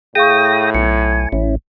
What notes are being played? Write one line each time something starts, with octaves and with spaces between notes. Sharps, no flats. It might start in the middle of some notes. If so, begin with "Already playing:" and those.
A2 G#4 F5 G5 C#6 D#6 A#6
B1 G#5 C#7
A1 C#4 E4